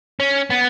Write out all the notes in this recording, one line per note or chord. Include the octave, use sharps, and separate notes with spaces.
C#4
B3